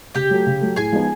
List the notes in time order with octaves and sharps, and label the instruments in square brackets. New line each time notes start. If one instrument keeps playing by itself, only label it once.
[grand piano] C#3 [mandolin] G4 G5
[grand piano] F#3 A3
C#3
F#3 A3
[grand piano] A2 [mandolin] G#4 G#5
[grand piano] F3 G#3 B3 D#4